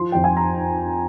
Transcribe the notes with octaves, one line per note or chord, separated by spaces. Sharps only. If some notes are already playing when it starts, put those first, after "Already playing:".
Already playing: F3 C6
F2 G5
G#5
A#5